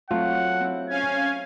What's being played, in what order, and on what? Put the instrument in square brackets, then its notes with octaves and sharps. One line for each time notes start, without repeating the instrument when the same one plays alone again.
[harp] F#3 A3 C4 [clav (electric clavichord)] F4 [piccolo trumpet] F#5
[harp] C4 E4
[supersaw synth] C#4 F5 G#5 [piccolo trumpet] G#6